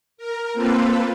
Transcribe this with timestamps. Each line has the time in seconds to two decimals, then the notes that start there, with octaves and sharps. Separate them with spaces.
0.17 A#4
0.53 A#3 C4 F4 A4 B4